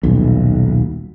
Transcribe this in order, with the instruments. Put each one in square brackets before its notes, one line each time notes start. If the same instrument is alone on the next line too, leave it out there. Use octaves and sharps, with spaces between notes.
[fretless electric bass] D#1 B1